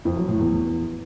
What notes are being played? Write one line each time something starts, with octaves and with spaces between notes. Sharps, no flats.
F2
F#3
A2
E2